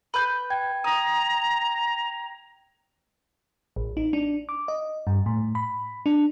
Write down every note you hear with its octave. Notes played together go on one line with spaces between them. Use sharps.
B4 G6
G5 G#6
A#5 D#6
A1
D#4
D4
D6
D#5
G2
A2
B5
D4